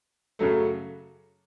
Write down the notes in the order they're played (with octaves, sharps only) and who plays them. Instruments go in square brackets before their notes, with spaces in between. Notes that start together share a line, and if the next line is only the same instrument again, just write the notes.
[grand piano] F#2 C#3 F#3 A3